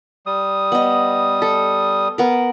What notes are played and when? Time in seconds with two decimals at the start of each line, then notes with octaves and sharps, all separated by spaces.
0.26 G3 D#6
0.72 B3 D#5
1.42 A4
2.18 B3 A#4